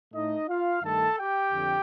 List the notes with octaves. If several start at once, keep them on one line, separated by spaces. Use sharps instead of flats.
A2 A3 D#4 D#5
F4 F5
G2 D#3 A3 A4 A5
G4 G5
F2 D3